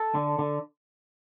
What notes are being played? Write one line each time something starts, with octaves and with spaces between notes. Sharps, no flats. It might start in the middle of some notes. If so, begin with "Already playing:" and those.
Already playing: A4
D3
D3